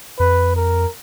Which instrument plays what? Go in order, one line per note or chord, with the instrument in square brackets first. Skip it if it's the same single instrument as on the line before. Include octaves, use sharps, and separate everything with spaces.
[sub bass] F2 [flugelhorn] B4
[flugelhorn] A#4